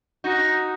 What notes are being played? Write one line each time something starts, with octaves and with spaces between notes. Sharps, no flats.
D#4 F#4